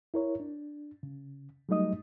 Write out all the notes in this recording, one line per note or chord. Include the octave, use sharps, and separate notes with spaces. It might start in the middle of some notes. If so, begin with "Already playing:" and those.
E4 A#4 C#5
D4
C#3
F#3 G3 A3 D#4 D#5 D#6